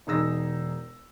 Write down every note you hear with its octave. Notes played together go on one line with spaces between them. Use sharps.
E1 D#4 G#4 E6 A#6